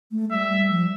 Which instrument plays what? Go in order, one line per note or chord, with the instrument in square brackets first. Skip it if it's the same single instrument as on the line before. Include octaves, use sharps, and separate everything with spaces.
[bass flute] A3
[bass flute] G3 [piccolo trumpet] E5
[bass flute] F3